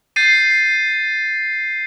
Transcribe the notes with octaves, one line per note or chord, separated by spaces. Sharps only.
G6 A6 C7 D#7